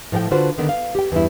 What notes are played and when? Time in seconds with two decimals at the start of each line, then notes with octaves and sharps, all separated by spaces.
0.12 A2 F3 A3 F#5 G5
0.31 D3 D4 F4 F#4 B4 C5
0.58 D3 D#3 B3
0.69 F5
0.95 G4 G5
1.12 E2 G2 E4